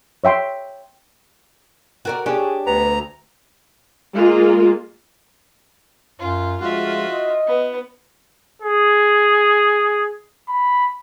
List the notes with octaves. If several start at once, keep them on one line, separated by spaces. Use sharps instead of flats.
C#5 E5 G5 C6
F#4 A#4 D5
D4 G4 G#4 C#5
D2 B3 A#5
G#3 A#3 F4
F#2 F4
D2 F3 G#3 F4 F#4 E5
D#5
B3
G#4
B5